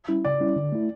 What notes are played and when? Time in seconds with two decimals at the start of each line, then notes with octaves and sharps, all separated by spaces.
0.09 G3 C#4 E4
0.25 C#3 D5
0.40 G3 C#4 E4
0.56 D3
0.72 A3 E4